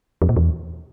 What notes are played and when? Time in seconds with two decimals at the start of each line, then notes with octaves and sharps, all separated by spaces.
0.22 F2
0.29 A#2
0.36 E2